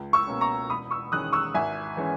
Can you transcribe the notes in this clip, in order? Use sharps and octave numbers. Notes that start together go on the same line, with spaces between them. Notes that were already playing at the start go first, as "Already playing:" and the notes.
Already playing: C#2
C#6 E6
B2 A#3 C#4
A#5 C#6
E1 B5 D#6
C#6 E6
E2 D#3 G#3 C#4 D#6 F#6
C#6 E6
G#1 E5 G#5
E3 G#3 C#4